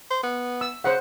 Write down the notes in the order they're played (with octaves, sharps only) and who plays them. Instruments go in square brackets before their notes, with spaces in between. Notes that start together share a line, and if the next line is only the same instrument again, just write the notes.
[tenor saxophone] C5
B3
[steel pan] E6
[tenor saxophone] C#3 [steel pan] C5 F#5